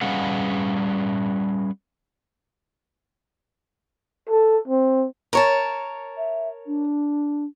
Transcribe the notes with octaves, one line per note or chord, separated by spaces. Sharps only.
G3 C#4 G#4 B4 F5 F#5
A4
C4
A#4 C#5 A5
E5
D4